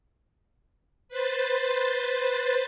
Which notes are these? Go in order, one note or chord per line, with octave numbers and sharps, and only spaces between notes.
B4 C5 A6